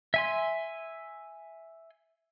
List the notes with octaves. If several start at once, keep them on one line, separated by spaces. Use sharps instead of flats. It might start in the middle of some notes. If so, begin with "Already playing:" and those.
E5 G#5 C6